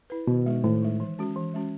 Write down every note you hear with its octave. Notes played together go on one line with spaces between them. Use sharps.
E4 B4
B2 D#3
G#3 D#4
A2 D#3
G#3 D#4
E3
G#3 C#4 F#4
E3
G#3 C#4 F#4